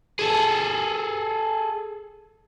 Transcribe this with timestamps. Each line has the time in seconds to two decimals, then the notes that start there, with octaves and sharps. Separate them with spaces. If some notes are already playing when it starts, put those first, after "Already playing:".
0.19 G#4 A4